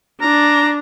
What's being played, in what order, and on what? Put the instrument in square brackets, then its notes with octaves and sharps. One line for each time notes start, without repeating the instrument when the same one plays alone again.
[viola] D4 [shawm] A#5